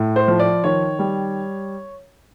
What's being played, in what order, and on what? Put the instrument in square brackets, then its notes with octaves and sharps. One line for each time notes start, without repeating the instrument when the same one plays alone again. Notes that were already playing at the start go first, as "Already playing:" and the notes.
Already playing: [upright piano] A2
C5
F3
D5
D#3 C#5
G3